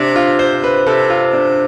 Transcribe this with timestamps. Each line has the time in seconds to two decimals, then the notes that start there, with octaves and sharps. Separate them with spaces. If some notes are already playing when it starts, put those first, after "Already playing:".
Already playing: C3 D4
0.16 F4
0.39 C5
0.64 B4
0.86 C3 A4
1.10 F4
1.33 D4